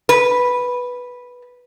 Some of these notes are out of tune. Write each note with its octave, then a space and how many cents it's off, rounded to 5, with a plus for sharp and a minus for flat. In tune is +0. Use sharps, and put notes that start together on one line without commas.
B4 -5